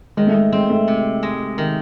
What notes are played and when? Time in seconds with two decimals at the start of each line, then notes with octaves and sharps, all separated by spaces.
0.17 D#3 G#3
0.27 A3
0.35 G#3
0.52 G#3 C4
0.70 A3
0.88 C3
1.23 G#3
1.58 D#3